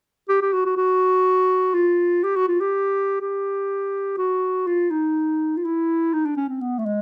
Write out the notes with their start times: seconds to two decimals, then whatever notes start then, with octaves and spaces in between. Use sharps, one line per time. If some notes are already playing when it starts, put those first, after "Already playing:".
0.29 G4
0.41 G4
0.53 F#4
0.66 F#4
0.77 F#4
1.75 F4
2.24 G4
2.36 F#4
2.48 F4
2.61 G4
3.21 G4
4.18 F#4
4.67 F4
4.91 D#4
5.57 F4
5.65 E4
6.13 D#4
6.26 D4
6.37 C#4
6.49 C4
6.61 B3
6.79 A3
6.86 G#3